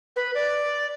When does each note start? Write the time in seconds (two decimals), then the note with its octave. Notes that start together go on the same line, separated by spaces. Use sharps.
0.16 B4
0.34 D5